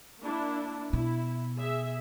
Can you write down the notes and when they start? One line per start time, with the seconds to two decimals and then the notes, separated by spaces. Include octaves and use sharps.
0.21 A#3 D4 E4
0.93 B2 E4
1.58 G#4 E5